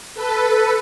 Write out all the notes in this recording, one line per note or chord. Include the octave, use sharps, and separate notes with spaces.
A4 B4